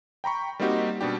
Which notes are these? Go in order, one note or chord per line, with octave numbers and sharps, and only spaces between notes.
G5 A#5 B5 C#6
G3 A#3 C4 D#4 F#4 G4
B2 G3 D4 G4